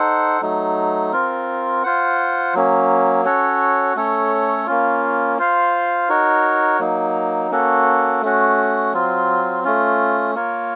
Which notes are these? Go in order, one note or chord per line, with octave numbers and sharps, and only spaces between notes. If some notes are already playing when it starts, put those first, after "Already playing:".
Already playing: D#4 A4 C5 F#5
F#3 A3 D#4
C4 F4 A#4
F4 C5 F#5
F#3 A#3 C#4
C#4 F#4 A4 C#5
A3 C#4 A4 C#5
A#3 C#4 F4
F4 C5 F5
D#4 F#4 A#4 C#5
F#3 A#3 D#4
A#3 C#4 F#4 A4
A3 C#4 F#4
F#3 C4 F4
A3 C#4 F4
A#3 F4 A#4 C#5